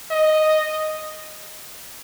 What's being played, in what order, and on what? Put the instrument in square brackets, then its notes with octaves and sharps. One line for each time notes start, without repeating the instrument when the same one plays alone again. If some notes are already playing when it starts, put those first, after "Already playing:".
[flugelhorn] D#5